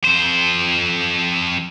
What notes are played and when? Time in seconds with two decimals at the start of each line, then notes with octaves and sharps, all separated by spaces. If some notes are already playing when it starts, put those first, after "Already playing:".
0.04 F2 C5